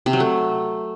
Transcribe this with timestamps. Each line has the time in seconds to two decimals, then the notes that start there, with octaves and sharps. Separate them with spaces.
0.06 C3
0.13 F#3
0.20 A3